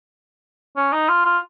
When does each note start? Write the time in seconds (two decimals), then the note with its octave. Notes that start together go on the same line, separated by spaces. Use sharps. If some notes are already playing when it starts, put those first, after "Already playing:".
0.76 C#4
0.93 D#4
1.09 F4
1.25 F4